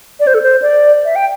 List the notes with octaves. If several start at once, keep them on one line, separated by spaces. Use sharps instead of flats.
D5
C5
A4
C5
D5
E5
G5